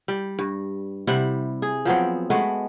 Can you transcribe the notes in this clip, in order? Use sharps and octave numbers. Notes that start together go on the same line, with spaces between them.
G3
G2
C3 G3 E4 F#5
G#4
F3 F#3 B3 C4
G#3 A3 B3 F#4